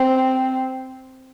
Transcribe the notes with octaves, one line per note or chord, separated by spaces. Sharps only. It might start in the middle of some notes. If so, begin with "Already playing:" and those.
Already playing: C4